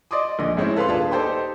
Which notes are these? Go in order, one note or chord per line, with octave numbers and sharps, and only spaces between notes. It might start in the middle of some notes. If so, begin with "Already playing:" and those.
D5 D#5 C6 D6 D#6
A#1 D3 D#5
G#2 C4 C#4 E4
A4 B4 F5 A5 C6
D#1 D4 F4 G#4 B4 A5
D#4 G4 A4 C5 G5 C6